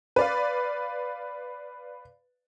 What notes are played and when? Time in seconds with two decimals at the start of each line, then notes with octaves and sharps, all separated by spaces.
0.16 B4 D5 F5